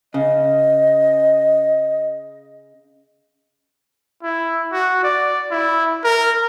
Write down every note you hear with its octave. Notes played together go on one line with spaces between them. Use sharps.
C#3 D#5
E4
F#4
D5
E4
A#4